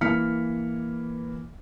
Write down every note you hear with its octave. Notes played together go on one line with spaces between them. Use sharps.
E3 A#3 F6 B6 C#7